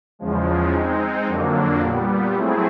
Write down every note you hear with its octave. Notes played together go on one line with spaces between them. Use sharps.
E2 C#3 F3 G#3
G#3 C4 D#4
F2 D3 F#3 A#3 D4
A#2 G3 B3
F#3 A3 C4 E4 G#4